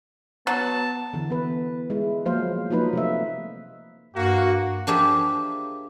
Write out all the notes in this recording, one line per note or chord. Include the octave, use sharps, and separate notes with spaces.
F#3 B3 A5
D3 E3
B3 B4
G#3 E4
F3 F#3 A#3 C5 F5
F3 F#3 A#3 D#4 B4
C3 A3 E5
G2 A#3 F#4
F3 A#3 D4 G4 G#4 E5